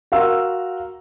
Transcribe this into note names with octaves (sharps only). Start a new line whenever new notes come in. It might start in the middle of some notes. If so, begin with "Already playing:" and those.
F#4 A#4 F5 C6 E6